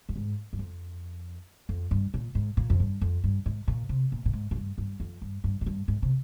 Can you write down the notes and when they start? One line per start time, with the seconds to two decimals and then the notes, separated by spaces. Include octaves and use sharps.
0.09 G2
0.16 G#2
0.53 G2
0.59 F2
1.69 F2
1.91 G2
2.14 A#2
2.35 G#2
2.57 A#2
2.70 F2
2.80 G2
3.01 F2
3.24 G2
3.46 G#2
3.68 A#2
3.89 C3
4.12 A#2
4.25 A#2
4.33 G#2
4.51 G#2
4.56 G2
4.78 G2
5.00 F2
5.22 G2
5.44 G2
5.61 G#2
5.66 G2
5.88 G#2
6.02 C3